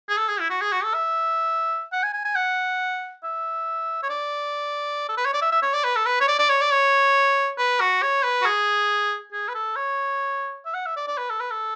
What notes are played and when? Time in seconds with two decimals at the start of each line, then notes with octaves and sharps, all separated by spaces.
0.09 G#4
0.18 A4
0.29 G#4
0.40 E4
0.50 F#4
0.61 G#4
0.72 F#4
0.84 A4
0.94 E5
1.92 F#5
2.03 G#5
2.13 G#5
2.25 G#5
2.35 F#5
3.23 E5
4.03 C#5
4.10 D5
5.09 A4
5.17 B4
5.25 C#5
5.33 D5
5.41 E5
5.52 E5
5.62 C#5
5.73 D5
5.84 B4
5.96 A4
6.05 B4
6.20 C#5
6.28 D5
6.39 D5
6.49 C#5
6.61 D5
6.71 C#5
7.58 B4
7.80 F#4
8.02 C#5
8.23 B4
8.42 F#4
8.45 G#4
9.32 G#4
9.48 B4
9.55 A4
9.76 C#5
10.66 E5
10.74 F#5
10.86 E5
10.96 D5
11.07 D5
11.17 B4
11.30 A4
11.40 B4
11.51 A4